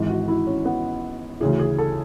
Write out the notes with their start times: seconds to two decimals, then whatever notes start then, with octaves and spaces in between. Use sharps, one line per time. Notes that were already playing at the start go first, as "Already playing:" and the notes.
Already playing: G#1 G#2 E3
0.09 F#4
0.28 E4
0.47 C#4
0.65 B3
1.40 D2 C#3 E3 G#4
1.59 G#4
1.78 A4